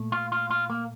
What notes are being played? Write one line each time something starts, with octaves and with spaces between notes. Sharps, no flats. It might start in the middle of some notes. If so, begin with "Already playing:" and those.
Already playing: A#2 A3
F4
F4
F4
A#3